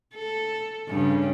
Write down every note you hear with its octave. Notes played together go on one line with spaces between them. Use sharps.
A4
G2 C#3